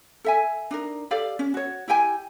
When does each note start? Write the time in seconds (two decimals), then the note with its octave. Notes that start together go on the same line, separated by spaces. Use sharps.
0.24 A4 E5 G#5
0.71 D4 D#4 A#4
1.11 G4 A4 D5 F5
1.39 C#4
1.54 F#4 C#5
1.88 E4 G4 G5 G#5